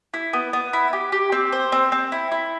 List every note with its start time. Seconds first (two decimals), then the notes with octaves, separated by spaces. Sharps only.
0.14 E4
0.33 B3
0.53 B3
0.73 E4
0.93 G4
1.12 G4
1.32 C4
1.52 C5
1.72 C4
1.92 C4
2.12 E4
2.31 E4